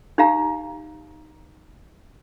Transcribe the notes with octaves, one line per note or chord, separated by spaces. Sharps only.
D#4 G4 F5 A#5